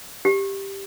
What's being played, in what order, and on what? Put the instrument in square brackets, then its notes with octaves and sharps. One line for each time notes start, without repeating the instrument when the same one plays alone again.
[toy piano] G4